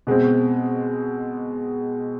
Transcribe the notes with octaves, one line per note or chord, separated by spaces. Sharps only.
B2 G#3 C4